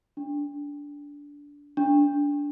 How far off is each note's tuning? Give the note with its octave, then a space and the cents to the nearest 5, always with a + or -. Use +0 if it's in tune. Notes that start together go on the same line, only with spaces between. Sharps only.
D4 -20
D4 -20